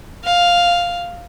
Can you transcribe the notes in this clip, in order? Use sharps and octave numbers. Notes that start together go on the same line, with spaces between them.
F5